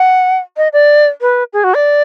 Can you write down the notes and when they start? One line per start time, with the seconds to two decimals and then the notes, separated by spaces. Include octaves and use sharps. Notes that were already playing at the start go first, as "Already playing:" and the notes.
Already playing: F#5
0.57 D#5
0.73 D5
1.21 B4
1.53 G#4
1.64 F#4
1.74 D5